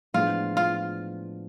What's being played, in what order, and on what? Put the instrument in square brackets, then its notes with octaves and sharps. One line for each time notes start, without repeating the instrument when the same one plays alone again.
[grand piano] A2 F3 G#3 B3 D4 [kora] F4
[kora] F4